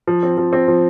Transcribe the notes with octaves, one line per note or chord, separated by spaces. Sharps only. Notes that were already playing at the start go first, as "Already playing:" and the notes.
F3
C4
F3
C4
F3